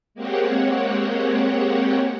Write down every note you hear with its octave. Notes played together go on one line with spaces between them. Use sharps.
G#3 A#3 C4 G4 C#5 F#5